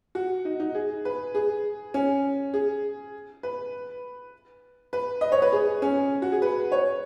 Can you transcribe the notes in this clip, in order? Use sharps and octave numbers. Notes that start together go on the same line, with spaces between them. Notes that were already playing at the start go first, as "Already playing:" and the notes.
F#4
D#4
D#4
G#4
B4
G#4
C#4
G#4
B4
B4
D#5
C#5
B4
G#4
C#4
F#4
G#4
B4
C#5